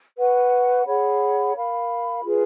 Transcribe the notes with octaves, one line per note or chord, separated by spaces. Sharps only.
B4 F#5 C#6
G#4 C#5 F#5 B5
A#4 F5 B5
F4 G#4 B4